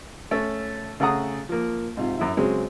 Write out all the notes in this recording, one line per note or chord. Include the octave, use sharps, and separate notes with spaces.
A3 C#4 C#5
C#3 A3 G#4 F#5 A#5 D#6
F3 A#3
G#2 C3 F4
F#2 E4
C#3 F#3 G#3 C4